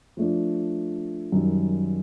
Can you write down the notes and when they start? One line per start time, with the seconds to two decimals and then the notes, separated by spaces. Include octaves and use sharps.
0.17 F3 A3 D4
1.32 F#2 D#3 G3